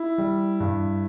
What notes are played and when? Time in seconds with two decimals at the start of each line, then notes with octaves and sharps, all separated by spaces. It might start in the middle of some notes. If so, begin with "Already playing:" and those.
Already playing: E4
0.18 G3
0.60 G2